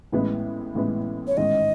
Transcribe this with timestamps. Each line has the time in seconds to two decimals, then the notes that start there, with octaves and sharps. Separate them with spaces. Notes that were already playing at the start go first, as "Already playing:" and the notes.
0.12 A1 A2 E3 G#3 B3
0.75 A1 A2 E3 G#3 B3
1.28 C#5
1.37 A1 G#2 D#3 G#3 D#5